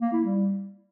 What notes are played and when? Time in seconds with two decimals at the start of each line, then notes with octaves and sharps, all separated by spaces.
0.01 A#3
0.13 E4
0.24 G3